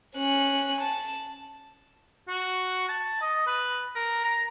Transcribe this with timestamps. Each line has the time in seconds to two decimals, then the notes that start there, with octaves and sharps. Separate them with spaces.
0.17 C#4 F#6
0.81 A5
2.28 F#4
2.89 A5
3.22 D#5
3.47 B4
3.95 A#4
4.24 A#5